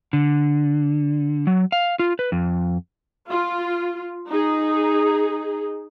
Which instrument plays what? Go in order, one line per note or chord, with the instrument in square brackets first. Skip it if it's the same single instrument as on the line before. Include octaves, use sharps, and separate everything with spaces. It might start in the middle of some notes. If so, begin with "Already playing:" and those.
[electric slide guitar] D3
F#3
F5
F4
B4
F2
[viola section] F4
D#4 G#4